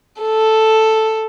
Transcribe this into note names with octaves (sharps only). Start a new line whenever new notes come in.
A4